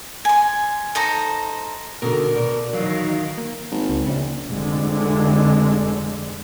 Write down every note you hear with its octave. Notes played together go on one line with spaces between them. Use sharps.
G#5 C6
D#4 A4 C5 A#5
B2 D3 D#3 A#4
B2 D5
D#3 E3 F#3 F5
A#3
G#1
C#2
A#1 C#3
F1 D3 G#3